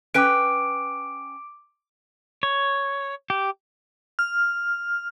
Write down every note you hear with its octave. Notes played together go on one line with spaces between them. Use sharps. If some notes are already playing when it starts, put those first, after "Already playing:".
C#4 B4 G5 D6 D7
C#5
G4
F6